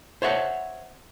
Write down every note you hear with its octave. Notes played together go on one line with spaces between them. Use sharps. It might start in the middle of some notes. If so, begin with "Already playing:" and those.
C5 C#5 E5 F#5